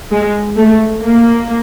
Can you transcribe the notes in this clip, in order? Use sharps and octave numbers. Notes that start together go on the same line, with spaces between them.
G#3
A3
A#3